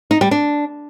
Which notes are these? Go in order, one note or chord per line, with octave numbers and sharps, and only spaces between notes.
D#4
G3
D4